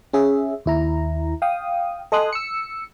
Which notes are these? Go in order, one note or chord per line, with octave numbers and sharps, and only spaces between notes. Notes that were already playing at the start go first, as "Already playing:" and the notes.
C#4 G#4 E5
D#2 E4 A#5
F5 G5 D#6
A4 D#5 G#5 C6 D#6 F#6
E6 C#7